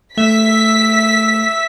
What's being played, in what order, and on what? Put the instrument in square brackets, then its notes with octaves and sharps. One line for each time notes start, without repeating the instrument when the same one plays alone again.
[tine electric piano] A3 [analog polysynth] E5 [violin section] B6